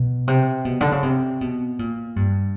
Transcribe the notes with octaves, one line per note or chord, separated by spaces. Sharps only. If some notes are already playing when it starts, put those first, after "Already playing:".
Already playing: B2
C3
B2
D3
C#3
C3
B2
A#2
G2